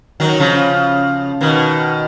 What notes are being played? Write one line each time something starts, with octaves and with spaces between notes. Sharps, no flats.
D#3 F#3
C#3 F3
B2 D#3